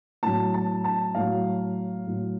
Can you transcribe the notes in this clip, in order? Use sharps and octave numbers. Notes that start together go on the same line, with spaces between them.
A2 F#3 A5
A5
A5
A2 F#3 F5
A2 F#3